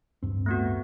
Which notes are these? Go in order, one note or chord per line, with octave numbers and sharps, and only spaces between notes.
D1 G2 C4
A3 B3 F#4